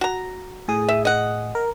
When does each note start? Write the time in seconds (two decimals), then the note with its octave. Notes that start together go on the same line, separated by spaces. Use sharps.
0.01 F#4 A#5
0.68 A2 G#4 D#6
0.89 E5
1.05 D#5 F#5
1.55 A#4